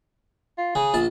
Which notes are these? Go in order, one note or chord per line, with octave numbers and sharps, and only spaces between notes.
F4
C#3 G#4
A#1 A5